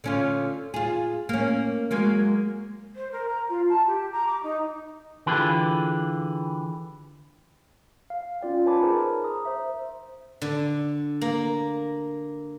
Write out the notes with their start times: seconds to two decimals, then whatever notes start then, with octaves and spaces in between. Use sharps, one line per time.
0.04 D3 C#4 F4
0.74 F4 G#4
1.29 A#3 C#4
1.91 F#3 G#3 A#3
2.95 C5
3.12 A#4
3.28 A#5
3.49 F4
3.69 A5
3.86 G4
4.12 A#5
4.27 D6
4.43 D#4
5.26 D3 E3 F4 G4 G#4 B4
8.10 F5
8.41 C#4 F4 D5 G5
8.66 B4 C#5 G#5 A5 B5 D6
8.81 D#4 G#4 A#4 C5
9.24 A#5 D#6
9.45 C5 E5
10.42 D3
11.21 A#3